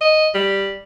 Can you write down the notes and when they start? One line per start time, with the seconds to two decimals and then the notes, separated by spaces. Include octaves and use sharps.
0.01 D#5
0.34 G3